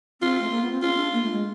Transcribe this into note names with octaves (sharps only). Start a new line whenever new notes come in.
C4 F4
A3
A#3
B3
C4
C#4 F4
D4
A#3
A3
G#3